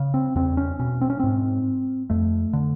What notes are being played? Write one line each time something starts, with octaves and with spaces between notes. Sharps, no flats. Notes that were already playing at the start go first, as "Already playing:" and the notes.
Already playing: C#3
C4
E2 C4
C#4
B2 C#4
C4
C#4
G#2 C4
F2 A3
D3